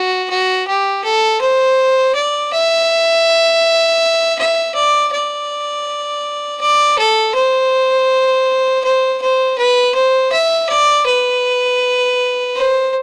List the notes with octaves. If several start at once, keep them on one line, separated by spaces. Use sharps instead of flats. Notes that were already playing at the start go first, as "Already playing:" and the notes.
Already playing: F#4
F#4
G4
A4
C5
D5
E5
E5
D5
D5
D5
A4
C5
C5
C5
B4
C5
E5
D5
B4
C5